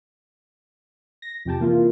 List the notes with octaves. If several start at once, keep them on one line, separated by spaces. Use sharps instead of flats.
A#6
F2 C3 G4 G5 A5
C3 E3 A#3 E4 F4 A#4